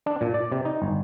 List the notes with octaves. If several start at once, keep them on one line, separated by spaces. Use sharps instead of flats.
D4
A#2
D5
C3
D#4
G1